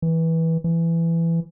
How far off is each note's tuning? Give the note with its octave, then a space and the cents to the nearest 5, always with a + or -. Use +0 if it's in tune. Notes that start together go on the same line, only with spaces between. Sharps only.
E3 -15
E3 +15